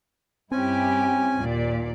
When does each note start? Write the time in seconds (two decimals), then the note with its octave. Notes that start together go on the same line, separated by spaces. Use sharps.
0.52 G2 C4 C#4 E4 G4 G#5
1.36 D#2 A#2 D5